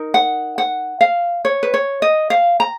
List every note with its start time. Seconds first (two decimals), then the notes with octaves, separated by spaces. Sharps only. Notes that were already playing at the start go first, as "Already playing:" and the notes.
Already playing: D#4 A#4
0.14 F#5
0.58 F#5
1.01 F5
1.45 C#5
1.63 B4
1.74 C#5
2.02 D#5
2.30 F5
2.60 A#5